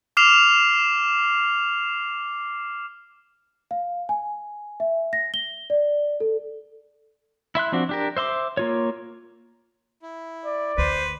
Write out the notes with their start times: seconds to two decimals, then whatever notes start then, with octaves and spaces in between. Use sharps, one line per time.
0.17 D6 F6 C7 E7 F7
3.71 F5
4.09 G#5
4.80 E5
5.13 A#6
5.34 G7
5.70 D5
6.20 A4
7.55 E4 E5 C6 F#6
7.72 F3 C4 D4 F#4
7.89 D4 G4 A#4
8.17 C5 E5 C6 D6
8.57 A#3 F4 C#5
10.02 E4
10.45 D5
10.78 D2 B4 C5